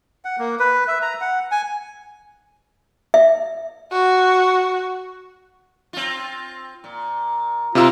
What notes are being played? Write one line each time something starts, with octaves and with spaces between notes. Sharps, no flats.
F#5
A#3
B4
E5
A#5
F#5
G#5
E5
F#4
C4 F4
A#2
C3 G#3 D#4 F4 A#4 E6